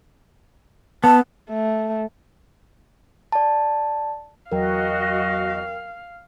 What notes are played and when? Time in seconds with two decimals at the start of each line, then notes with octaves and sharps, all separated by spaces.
1.04 B3 A5
1.50 A3
3.32 D5 A5
4.52 E2 F#3 F#4 A#4 D#5 F5 G5